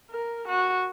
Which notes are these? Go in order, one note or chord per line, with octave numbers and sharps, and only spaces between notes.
A#4
F#4